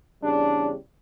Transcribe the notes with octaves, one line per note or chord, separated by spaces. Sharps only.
E2 C#3 G3 D4